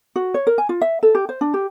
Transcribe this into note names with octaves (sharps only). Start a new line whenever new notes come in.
F#4
C#5
A#4
G#5
F4
E5
A4
G4
C5
D4
G4